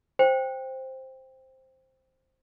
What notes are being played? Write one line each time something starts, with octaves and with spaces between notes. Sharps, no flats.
C5 G5